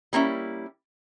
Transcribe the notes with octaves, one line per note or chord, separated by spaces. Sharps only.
G3 A#3 C#4 E4